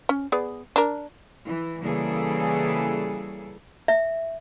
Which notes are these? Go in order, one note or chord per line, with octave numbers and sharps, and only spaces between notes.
C#4
B3 G#4 D5
D4 A#4
E3
C#3 E3 G3 A#3 G#4 A4
E5